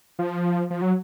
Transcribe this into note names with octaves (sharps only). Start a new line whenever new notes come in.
F3
F3
F#3